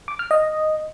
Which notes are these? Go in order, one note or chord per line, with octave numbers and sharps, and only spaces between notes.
D6
F6
D#5